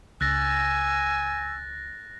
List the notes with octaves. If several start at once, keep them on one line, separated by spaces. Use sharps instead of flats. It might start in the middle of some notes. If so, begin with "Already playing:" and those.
C#2 G#5 E6 F#6 A6 A#6